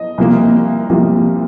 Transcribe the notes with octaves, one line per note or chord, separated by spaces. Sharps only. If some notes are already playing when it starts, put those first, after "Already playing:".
Already playing: D#5
C2 C3 F3 A#3
C2 C3 F3 A#3